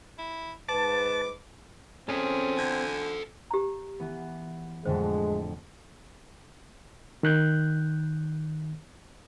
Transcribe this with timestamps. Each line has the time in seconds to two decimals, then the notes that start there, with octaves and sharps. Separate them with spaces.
0.18 E4
0.69 G#2 B4 A5 D6
2.09 C4 C#4 G#4 A4 C5
2.57 D3 G#5
3.51 G4 A#5
3.99 E3 B3
4.85 F2 A2 D3 G#3 C5
7.23 D#3 F#6 G6